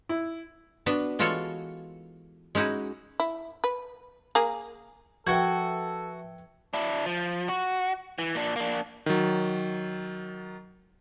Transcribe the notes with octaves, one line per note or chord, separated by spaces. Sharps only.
E4
B3 D4 F#4 B4
E3 G#3 F4 F#4 A4 C#5
G#3 C#4 D#4 E4 F#4
E4
B4
A#3 G#4
F3 F#4 A4 B4 E5 G5 G#6
D4 E4
F3
F#4
E3
A#2 D4
A#3 D4
D#3 F#3